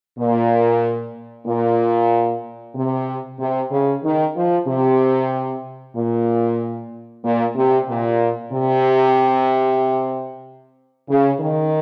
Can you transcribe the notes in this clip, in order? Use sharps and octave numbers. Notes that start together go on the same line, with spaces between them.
A#2
A#2
C3
C3
C#3
D#3
F3
C3
A#2
A#2
C3
A#2
C3
C#3
D#3